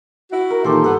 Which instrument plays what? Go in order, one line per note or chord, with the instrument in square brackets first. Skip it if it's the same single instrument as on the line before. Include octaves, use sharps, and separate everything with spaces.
[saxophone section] E4 F#4
[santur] A#4
[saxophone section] A#2 D#3 E3 [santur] G4 A4 C5
[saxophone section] G2 B3 [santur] A4